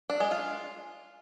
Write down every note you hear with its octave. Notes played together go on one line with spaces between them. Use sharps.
D4
G#3
F4